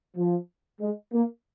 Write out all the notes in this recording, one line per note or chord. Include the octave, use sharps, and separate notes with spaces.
F3
G#3
A#3